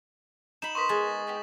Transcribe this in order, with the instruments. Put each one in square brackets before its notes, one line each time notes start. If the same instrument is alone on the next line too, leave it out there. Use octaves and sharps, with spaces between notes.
[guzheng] D#4 B5 [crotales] E7 F#7
[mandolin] B3 A#4 C6 [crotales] C#6 D#6 B6
[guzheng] G#3 [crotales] A6
[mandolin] B3 G4 G5